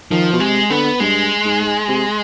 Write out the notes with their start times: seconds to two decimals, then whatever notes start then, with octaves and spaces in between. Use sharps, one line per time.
0.11 D#3 F3
0.33 B2
0.40 C3 G#3
0.70 D3 B3
1.00 G2 G#3
1.45 G#2
1.89 C3